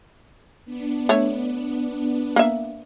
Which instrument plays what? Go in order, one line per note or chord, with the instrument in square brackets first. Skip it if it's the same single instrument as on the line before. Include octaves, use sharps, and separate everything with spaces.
[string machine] B3 D4
[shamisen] A3 C#5
A#3 E5